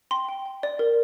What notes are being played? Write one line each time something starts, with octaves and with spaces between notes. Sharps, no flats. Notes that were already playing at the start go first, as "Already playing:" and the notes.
G5 C6
G5
G5
D5
A#4